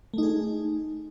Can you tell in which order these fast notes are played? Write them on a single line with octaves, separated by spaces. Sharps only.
A3 D#4 G#4